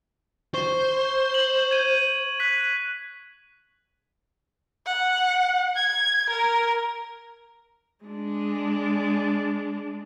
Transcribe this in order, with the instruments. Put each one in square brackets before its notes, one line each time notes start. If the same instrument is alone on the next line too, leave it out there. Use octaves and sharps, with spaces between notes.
[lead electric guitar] C5 [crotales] C#6
[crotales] F#7
G#6 D#7
F#6 B6
[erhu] F#5
G#6
A#4
[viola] G#3 D4